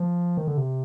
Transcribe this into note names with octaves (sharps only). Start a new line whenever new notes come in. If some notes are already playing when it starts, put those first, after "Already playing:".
Already playing: F3
D#3
D3
C3